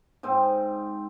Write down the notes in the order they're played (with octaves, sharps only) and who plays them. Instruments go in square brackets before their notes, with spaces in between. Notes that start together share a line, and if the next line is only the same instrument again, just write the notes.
[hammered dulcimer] G#2 C4 C5